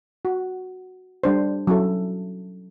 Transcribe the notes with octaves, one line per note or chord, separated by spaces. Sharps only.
F#4
G3 D4 C5
F#3 C#4 E4 A4